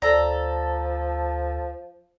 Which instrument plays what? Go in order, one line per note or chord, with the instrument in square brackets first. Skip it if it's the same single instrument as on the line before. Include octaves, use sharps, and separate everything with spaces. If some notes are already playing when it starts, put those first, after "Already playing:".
[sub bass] D2 [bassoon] F3 [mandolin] A4 A#5 [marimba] D5